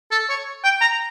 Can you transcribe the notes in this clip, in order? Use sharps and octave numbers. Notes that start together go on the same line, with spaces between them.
A4
C#5
G5
A#5